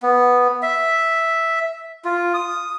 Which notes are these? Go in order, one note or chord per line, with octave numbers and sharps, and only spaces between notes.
B3
E5
F4
D#6